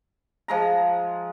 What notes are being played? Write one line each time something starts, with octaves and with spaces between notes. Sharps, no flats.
F3 G#3 A#5